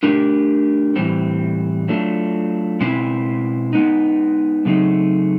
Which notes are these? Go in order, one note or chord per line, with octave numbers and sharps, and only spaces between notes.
A3 D4 G4 A#4
A2 E3 G3 C4
F#3 A3 D4 F4
B2 G#3 C4 E4
G#3 B3 D#4
C#3 F#3 A3 C4 D#4